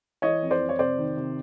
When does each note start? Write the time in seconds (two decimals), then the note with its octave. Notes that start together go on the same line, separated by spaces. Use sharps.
0.22 E3 C#5 D#5
0.42 F2
0.51 C5 D5
0.60 F2
0.69 C#5
0.79 C3 C5 D5
0.98 D#3
1.17 C3